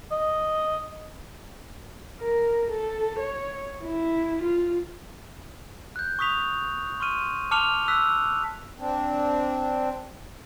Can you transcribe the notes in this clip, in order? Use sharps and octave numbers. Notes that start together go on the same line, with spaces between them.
D#5
A#4
A4
C#5
E4
F4
F#6 G6
C#6 D#6 B6 F7
C6 C#6 F6 D#7
A5 D6 F6 C#7 F7 G7
E6 F#6 B6
C4 D4